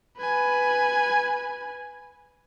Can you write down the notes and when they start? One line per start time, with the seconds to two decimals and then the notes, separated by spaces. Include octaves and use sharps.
0.17 B4 G#5